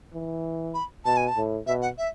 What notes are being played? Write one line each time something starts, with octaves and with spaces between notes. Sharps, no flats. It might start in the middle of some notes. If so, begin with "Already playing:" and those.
E3
B5
B2 A5
G#5
A5
A2
B2 E5
F#5
E5